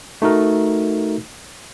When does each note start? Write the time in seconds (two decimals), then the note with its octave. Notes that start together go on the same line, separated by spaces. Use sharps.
0.22 A3 D#4 F#4 A#4